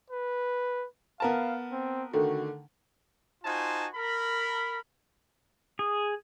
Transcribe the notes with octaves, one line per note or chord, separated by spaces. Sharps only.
B4
B3 A#4 F5 A5
C4
D3 D#3 A3 F#4
D#4 F4 F#4 C5 G#5 A5
A#4 B5
G#4